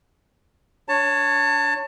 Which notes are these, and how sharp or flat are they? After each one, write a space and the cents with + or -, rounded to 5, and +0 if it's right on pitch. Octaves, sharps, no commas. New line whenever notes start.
D4 -25 C#5 +0 A5 +25